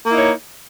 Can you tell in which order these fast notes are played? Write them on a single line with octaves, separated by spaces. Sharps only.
A#3 E4 D#4 C#5